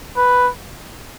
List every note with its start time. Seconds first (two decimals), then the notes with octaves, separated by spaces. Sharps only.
0.17 B4